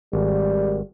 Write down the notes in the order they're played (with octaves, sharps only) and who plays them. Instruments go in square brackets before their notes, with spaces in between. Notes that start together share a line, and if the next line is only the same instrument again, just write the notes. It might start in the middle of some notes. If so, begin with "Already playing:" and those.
[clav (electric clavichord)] G#1 [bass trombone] G3